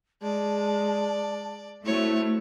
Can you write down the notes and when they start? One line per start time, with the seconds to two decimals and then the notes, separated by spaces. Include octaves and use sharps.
0.22 G#3 D5 A5
1.86 A3 C4 E4 F#4 C#5